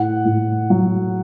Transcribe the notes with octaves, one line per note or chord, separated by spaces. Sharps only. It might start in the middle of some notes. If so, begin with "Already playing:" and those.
Already playing: A2 F#5
A2
F#3